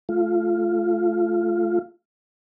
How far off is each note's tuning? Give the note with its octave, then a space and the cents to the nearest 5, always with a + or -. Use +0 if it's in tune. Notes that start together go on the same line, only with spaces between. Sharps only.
A3 -25 F4 -10